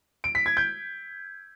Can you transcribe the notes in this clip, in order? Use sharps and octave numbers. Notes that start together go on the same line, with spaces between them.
D7
B6
G#6
G6